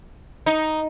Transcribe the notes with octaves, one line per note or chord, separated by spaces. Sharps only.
D#4